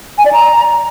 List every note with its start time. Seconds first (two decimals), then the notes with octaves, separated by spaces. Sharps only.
0.18 G#5
0.25 D5
0.33 A#5